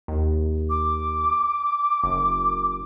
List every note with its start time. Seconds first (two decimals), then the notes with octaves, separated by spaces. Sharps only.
0.08 D#2
0.69 D6
2.04 F#1